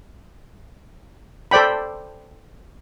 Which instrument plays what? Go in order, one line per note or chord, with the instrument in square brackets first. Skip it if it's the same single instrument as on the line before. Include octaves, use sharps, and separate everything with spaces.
[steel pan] A4 C5 D5 G5 B5